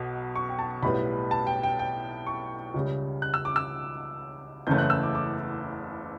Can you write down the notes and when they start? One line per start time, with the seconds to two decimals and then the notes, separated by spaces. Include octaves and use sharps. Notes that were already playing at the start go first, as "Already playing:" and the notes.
Already playing: B1 B2
0.35 C#6
0.49 G5
0.59 A5
0.82 B1 A2 G3 B3 B5
1.31 A5
1.47 G5
1.63 G5
1.79 G5
2.27 C#6
2.74 C#2 C#3 G3
3.22 F#6
3.34 E6
3.45 D6
3.56 E6
4.67 F#1 E2 C#3 E3 A3 G6
4.78 F#6
4.90 E6
5.03 D6
5.15 D6